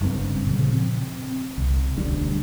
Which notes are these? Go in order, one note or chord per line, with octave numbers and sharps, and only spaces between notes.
F#1 G2 C3 C4
A#2 C#3 F3
C4
C2
E1 D2 G3 D4